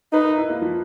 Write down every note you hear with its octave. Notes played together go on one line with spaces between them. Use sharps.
D#4 B4
A#4
E4
A#3
F3